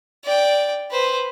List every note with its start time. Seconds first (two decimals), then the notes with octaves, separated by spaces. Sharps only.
0.24 D5 G5
0.91 B4 C5